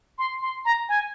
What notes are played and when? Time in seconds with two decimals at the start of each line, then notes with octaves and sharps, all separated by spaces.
0.18 C6
0.42 C6
0.65 A#5
0.89 G#5